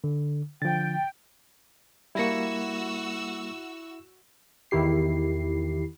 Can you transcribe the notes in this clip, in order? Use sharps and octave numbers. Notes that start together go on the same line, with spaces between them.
D3
D3 F3 G5 A6
G3 A#3 E4 F#4 E6 A#6 C#7
E2 D#3 E4 G4 C7